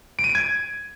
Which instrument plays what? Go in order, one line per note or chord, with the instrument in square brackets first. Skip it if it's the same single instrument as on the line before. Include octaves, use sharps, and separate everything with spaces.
[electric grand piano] D7
D#7
D7
G#6